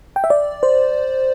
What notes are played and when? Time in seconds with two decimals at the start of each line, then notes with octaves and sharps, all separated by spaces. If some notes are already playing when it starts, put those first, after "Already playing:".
0.16 G5
0.24 E5
0.30 D5
0.63 C5